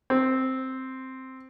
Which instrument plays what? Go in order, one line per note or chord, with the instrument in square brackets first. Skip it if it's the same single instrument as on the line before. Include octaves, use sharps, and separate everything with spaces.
[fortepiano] C4